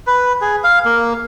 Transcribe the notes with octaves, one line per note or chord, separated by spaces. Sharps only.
B4
G#4
F5
A#3